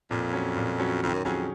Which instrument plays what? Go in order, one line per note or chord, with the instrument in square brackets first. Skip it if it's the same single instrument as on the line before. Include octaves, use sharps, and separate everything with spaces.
[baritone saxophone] F2 [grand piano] A#2
[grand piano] F#3 C#4
A#2
F#3 C#4
[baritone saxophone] F2 [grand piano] D#3
[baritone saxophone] F#2
[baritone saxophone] F2 [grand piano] F#3 C#4 G#4